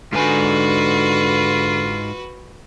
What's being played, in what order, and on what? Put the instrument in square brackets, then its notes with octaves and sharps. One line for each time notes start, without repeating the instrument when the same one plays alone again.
[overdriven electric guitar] G#2 G#5 [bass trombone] D3 [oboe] F4 [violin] F#4 B4